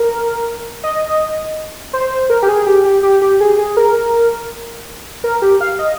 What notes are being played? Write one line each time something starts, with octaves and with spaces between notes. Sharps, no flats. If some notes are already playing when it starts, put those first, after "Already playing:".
Already playing: A#4
D#5
C5
A#4
G4
G#4
G4
G4
G4
G4
G#4
G#4
A#4
A#4
G4
F5
D#5